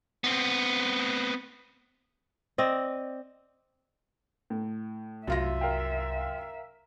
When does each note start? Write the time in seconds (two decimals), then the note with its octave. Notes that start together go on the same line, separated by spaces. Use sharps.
0.24 B3 C4
2.58 C4 D5 D#5
4.50 A2
5.27 C2 F#2 F4 E5 A#6
5.61 A#4 F5 G5